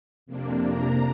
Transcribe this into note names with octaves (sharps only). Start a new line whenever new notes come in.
F2 C3 A#3 D4
A#5